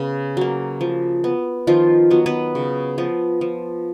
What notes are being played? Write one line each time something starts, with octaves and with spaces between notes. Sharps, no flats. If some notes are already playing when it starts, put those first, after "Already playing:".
Already playing: C#3 B3
F#3 A#3
F3
B3
D#3 F3 F4
F#3 B3
B3 B4
C#3
F3 B3
F3